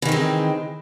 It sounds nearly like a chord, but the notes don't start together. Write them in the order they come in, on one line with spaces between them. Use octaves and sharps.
E3 D#3 C4 G#3